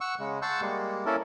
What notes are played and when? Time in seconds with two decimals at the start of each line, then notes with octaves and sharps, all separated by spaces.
0.01 F#5 C#6 E6
0.20 C#3 G#3
0.42 F#5 A5 C6 C#6 E6 G6
0.61 G3 G#3 A#3
1.06 A#3 C#4 E4 A4 A#4